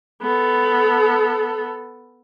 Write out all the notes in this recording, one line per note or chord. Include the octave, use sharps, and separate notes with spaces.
B3 A4